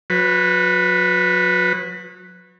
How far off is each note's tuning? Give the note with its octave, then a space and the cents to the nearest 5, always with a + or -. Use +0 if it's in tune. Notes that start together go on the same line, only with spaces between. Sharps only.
F#3 -35 B4 +0